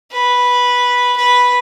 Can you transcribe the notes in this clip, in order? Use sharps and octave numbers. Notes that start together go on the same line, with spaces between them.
B4
B4